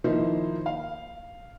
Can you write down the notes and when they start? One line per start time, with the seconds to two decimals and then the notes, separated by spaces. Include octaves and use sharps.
0.04 D#3 F3 A#3 D#4 E4 C5
0.66 F5